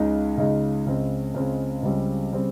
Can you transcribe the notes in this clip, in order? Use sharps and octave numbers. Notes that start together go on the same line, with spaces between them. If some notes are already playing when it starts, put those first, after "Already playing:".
Already playing: C#2 C#3 G#3 D#4
C#2 C#3 G#3 D#4
C#2 C#3 G#3 C4
C#2 C#3 G#3 C4
C#2 C#3 G3 C4
C#3 G3 C4